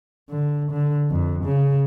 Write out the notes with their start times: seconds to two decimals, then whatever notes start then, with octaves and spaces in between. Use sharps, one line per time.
0.30 D3
0.71 D3
1.10 F2
1.45 C#3